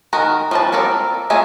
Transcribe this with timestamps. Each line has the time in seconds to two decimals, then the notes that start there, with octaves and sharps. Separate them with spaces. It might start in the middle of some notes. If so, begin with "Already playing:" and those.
0.13 D#3 F#4 A#4
0.51 F3 G3 A5
0.72 A#3 C4 A4 A#4 D5
1.30 A3 A#3 F4 G#4